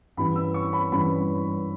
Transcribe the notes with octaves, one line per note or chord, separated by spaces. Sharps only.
G2 E3 G3 C#4 B5
E6
C#6
B5
G2 E3 G3 C#4 B5